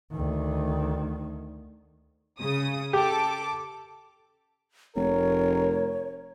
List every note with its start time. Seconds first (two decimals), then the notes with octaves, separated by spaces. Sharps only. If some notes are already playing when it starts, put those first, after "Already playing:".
0.11 D2 D#3
2.39 C#3 D#6
2.93 G4 A4 D6
4.96 F1 A#4 C#5